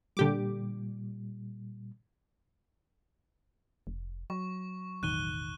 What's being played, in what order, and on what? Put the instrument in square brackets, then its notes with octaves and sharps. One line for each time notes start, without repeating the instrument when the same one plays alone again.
[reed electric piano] A#2 G3 [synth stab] D3 G4 D6
[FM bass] F1
[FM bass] F#3 [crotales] C#6
[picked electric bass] E1 A1 D#3 [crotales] F#6 D#7 G7